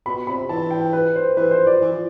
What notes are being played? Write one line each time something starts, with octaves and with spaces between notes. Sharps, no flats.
B2 B5
C3 B5
E3 A5
G5
B4
C5
E3 B4
C5
F3
D5
E3
F3